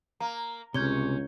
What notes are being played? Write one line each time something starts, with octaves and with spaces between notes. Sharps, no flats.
A#3 A#5
G1 C#2 C3 C#4 G6 G#6 G7